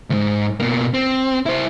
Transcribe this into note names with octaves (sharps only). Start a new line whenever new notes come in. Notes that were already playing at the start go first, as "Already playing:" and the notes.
D2 G#2
B2 A#3
C4
E4 C5